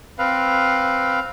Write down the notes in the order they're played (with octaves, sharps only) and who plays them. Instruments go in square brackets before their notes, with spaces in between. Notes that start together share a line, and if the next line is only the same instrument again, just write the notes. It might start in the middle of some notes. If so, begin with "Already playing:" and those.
[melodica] C4 B4 F5